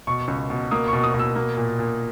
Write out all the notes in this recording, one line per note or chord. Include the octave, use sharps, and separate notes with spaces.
B2 C#6
C#2
B2
A#3 D#6
C#6
B2
D#6
B2
E6
A#3
A#2
A#2